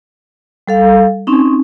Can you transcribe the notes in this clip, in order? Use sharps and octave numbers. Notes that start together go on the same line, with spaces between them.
G3 A4 F5
C4 C#4 D#4